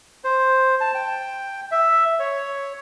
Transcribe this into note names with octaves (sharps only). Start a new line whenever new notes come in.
C5
A5
G5
E5
C#5